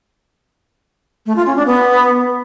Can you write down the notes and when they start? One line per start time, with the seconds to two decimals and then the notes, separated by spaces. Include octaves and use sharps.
1.26 A3
1.36 F4
1.46 C#4
1.56 D4
1.66 B3